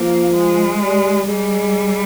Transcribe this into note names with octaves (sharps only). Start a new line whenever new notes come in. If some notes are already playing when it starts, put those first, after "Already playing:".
Already playing: F3 A#3
G#3
G3
G3 G#3